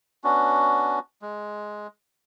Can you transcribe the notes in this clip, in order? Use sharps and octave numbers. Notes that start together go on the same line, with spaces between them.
B3 C#4 D4 F#4
G#3